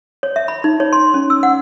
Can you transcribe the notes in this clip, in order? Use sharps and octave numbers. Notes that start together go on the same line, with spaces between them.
C#5
E5
B5
D#4
C#5
C6
C#4
E6
F#5